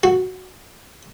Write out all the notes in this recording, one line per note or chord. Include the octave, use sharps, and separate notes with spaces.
F#4